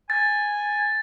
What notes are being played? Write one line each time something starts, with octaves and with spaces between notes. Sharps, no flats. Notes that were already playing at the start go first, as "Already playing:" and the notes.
G#5 A6